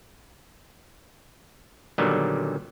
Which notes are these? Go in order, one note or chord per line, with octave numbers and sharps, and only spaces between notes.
A#2 D3 D#3 F#3 G3 B3